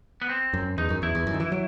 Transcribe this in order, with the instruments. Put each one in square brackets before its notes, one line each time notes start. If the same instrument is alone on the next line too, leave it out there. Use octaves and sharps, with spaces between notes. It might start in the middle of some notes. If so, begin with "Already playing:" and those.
[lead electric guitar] B3
C4
[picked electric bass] F#2
[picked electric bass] E2 [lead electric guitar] D#4
[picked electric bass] F#2
[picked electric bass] E2 [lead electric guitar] E4
[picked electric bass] E2
F#2
D#3
E3
F#3